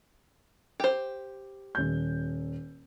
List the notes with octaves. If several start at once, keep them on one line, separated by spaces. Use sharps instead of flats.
G4 C5
D#1 G6